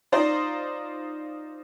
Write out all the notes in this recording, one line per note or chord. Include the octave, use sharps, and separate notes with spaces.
D#4 F4 C5 D5